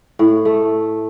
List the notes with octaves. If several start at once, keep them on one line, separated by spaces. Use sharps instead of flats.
A2
A3